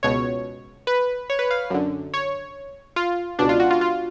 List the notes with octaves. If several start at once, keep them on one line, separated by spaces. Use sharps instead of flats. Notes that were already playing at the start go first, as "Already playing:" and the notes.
C#2 B2 C#5
B4
C#5
B4
F5
F#2 D3
C#5
F4
C#2 B2 D4
F4
F#4
F4
F4